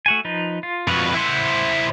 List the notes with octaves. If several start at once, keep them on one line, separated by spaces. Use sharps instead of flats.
A3 F#4 G#5
F3 D#4 B4
F4
F2 F4 F#4 B4 C#6
E4 C5 E5 F#5